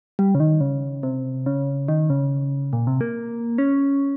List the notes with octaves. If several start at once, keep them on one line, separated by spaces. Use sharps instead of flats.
G3
C#3
D#3
C#3
C3
C#3
D#3
C#3
A#2
C3
A#3
C#4